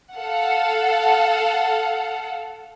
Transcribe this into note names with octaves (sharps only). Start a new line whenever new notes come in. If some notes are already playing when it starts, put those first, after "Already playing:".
A4 F5 F#5